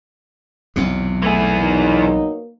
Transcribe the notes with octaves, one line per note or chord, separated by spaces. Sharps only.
B1 E2 C3
E3 A3 G#4
F#3 A#3 B3 D#4